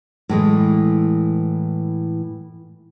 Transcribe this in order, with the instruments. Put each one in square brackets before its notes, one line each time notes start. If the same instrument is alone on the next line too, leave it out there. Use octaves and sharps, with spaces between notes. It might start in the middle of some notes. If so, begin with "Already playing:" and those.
[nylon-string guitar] A2 E3 G#3